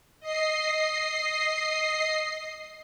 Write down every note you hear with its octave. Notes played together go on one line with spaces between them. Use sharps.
D#5 C7